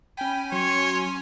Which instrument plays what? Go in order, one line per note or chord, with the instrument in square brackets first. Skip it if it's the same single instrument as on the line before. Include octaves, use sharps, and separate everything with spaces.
[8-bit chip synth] C#4 G#5 [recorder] G5 [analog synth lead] B5
[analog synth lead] F#3 [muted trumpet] C#5 [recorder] C6